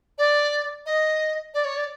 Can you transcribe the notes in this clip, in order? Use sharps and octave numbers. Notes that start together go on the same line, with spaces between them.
D5
D#5
D5
C#5
D5